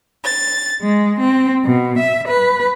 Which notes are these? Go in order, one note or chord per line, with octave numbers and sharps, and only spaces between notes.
A6
G#3
C4
B2
E5
B4